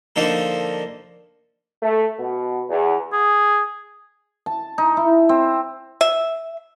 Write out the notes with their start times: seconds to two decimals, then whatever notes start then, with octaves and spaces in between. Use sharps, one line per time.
0.16 D3 F3 A#3 D#4 A4
1.82 A3
2.18 B2
2.68 E2
3.13 G#4
4.46 A5
4.78 D#4
4.97 E4
5.29 C4
6.01 E5